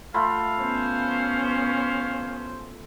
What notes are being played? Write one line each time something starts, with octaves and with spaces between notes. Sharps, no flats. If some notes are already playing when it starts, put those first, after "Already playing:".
A3 F4 F5 B5
B3 C#4 C5